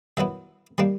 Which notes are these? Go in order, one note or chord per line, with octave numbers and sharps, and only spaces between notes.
D#3 F#3 B3 E4 E5
D#3 G3 A#3 D4